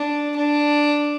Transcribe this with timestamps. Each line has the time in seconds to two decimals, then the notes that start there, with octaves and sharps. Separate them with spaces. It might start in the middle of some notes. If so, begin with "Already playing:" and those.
Already playing: D4
0.36 D4